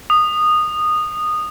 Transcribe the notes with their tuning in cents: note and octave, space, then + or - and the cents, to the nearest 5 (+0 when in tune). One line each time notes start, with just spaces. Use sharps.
D#6 -15